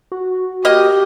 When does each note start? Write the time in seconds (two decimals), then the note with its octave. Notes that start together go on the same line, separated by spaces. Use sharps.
0.12 F#4
0.65 A#3 G4 D#5